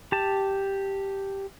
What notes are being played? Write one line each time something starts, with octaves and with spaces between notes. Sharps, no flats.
G4 A5